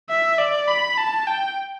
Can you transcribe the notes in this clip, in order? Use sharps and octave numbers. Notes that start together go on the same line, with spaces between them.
E5
D5
B5
A5
G5